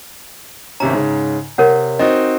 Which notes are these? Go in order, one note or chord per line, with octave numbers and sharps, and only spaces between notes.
G#1 C3 C#4 A#5
G#2 C#3
C3 A#4 C#5 F#5
C4 D#4 F#4 D#5